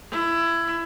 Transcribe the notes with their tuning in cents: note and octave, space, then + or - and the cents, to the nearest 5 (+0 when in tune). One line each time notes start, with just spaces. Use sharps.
E4 +20